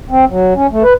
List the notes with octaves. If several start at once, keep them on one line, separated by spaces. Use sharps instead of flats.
C4
F#3
C#4
A3
B4